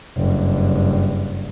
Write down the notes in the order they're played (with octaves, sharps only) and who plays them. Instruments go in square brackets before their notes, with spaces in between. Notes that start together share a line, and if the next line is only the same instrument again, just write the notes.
[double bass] F#1 G2